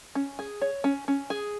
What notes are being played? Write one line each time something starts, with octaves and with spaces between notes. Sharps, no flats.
C#4
G#4
C#5
C#4
C#4
G#4